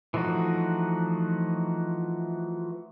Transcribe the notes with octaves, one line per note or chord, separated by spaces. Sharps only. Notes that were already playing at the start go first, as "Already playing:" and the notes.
E3 F3 A3 D#4 F#4